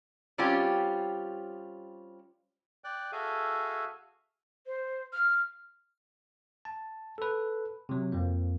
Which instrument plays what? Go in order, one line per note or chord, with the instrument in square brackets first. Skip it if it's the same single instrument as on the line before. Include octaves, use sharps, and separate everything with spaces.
[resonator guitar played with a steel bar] G3 C4 C#4 F4 G4
[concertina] D5 G5 F#6
F#4 G#4 A4 E5 F5 G#5
[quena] C5
F6
[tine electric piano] A5
A4 B4
C3 F#3
F2 F3 A#3